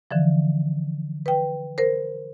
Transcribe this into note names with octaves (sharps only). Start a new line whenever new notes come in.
D3 E3 F3
B4 G5
A#4 C5